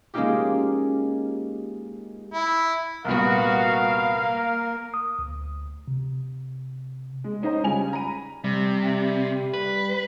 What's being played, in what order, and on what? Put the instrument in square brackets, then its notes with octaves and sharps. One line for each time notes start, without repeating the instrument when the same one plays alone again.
[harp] G#3 A#3 C#4 D#4 F4 G4
[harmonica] E4
[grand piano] C2 A#2 B3 [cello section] G3 F#4 [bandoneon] A#4 [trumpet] F5
[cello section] A#3
[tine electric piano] D#6
D2
C3
[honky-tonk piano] G#3
C#4 D#4 C5 D#5 A#5
C#3 G3 G#3 F4 G#5 F7
A#5 B5 D#7
[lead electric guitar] C3 [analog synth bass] G3
[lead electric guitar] B4